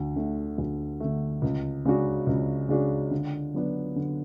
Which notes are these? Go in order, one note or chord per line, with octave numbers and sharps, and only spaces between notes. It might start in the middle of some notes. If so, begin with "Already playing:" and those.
Already playing: D2
D3 A3
D2
D3 A3
C#2
C#3 G#3 D4 F#4
C#2
C#3 G#3 D4 F#4
D3
F#3 B3 D4
D3